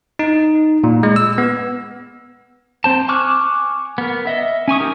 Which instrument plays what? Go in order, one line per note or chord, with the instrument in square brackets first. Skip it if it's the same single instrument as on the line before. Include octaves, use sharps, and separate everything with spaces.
[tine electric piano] D#4
A#2
G#3
E6
B3
[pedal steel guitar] C4 C5 A5
G#5 C#6 D6 F6 F#6
B3 A#4
D#5 E5
C#4 G#5 C#6 D#6
C#4 D#4 G4 A#4